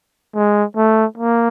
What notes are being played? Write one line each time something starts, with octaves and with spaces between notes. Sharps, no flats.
G#3
A3
A#3